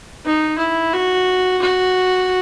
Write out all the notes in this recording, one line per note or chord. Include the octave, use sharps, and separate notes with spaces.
D#4
E4
F#4
F#4